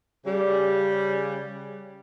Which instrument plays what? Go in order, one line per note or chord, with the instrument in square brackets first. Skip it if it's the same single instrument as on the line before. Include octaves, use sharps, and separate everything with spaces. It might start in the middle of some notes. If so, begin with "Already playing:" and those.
[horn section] C#3 G3